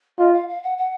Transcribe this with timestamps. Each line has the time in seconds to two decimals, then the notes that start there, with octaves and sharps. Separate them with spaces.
0.19 F4 D#5
0.33 F5
0.48 F5
0.63 F#5
0.78 F#5